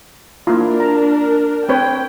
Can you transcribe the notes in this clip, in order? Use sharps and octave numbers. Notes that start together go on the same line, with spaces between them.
A#3 D4 E4 F4 A#4
A#5
C4 B4 C#5 G5